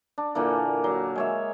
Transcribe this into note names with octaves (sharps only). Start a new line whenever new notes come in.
D4
A#2 D3 E3 A#3
F#3
G#3 C#5 E5